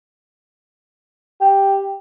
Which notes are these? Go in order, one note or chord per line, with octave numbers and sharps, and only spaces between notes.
G4